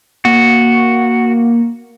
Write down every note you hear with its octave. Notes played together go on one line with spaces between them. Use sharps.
A#3 F#4